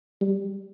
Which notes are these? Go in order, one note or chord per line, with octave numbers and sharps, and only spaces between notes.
G3